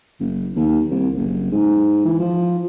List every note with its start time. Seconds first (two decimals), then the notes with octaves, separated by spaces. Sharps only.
0.20 F#1
0.56 D#2
0.91 C2
1.16 F#1
1.52 G#2
2.05 E3
2.20 F3